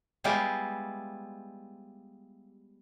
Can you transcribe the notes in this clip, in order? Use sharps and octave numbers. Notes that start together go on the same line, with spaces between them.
G3 G#3 B3 E4 F4 G4